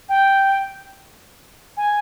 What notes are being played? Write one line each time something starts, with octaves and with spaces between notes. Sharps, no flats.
G5
G#5